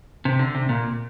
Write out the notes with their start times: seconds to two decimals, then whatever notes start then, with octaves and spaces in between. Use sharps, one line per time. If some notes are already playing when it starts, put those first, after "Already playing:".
0.25 C3
0.39 D3
0.55 C3
0.69 A#2